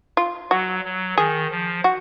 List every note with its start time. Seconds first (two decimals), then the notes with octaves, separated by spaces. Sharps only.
0.17 F4
0.51 F#3 F#4
0.85 F#3
1.17 D#3 G#4
1.51 F3
1.84 F#4